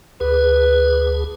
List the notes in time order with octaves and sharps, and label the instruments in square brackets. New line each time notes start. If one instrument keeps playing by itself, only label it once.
[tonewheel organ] D2 G#4 [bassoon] B4